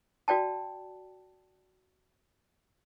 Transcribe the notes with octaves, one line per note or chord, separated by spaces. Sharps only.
F#4 D5 G5 A5